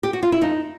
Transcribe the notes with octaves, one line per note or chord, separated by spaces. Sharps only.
G4
F#4
F4
E4
F2 D#4